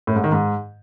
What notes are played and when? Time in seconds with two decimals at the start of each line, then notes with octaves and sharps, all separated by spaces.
0.07 A2
0.16 G#2
0.24 D#3
0.32 G#2